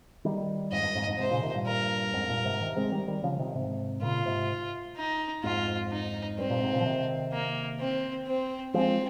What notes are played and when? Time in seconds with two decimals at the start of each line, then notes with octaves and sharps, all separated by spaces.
0.25 D#3 G3
0.72 F2 G#2 D#5
0.84 G2
0.95 F2 G#2
1.07 F2 G#2
1.19 G#2 C3 C5
1.31 A#2 C#3
1.42 C3 D#3
1.55 G2 A#2
1.67 A#4
2.13 F2 G#2
2.29 G2 A#2
2.45 G#2 C3
2.60 C3 D#3
2.76 G#3 C4
2.92 D#3 G3
3.08 D#3 G3
3.23 C#3 F3
3.39 C3 D#3
3.55 G#2 C3
4.02 A#2 C#3 F4
4.25 G#2 C3
4.96 D#4
5.44 F2 G#2 F4
5.91 D#4
6.38 G2 C4
6.50 G2 A#2
6.62 G#2 C3
6.73 A#2 C#3
6.81 F3
6.85 C3 D#3
7.33 A#3
7.80 C4
8.27 C4
8.74 F3 G#3 C4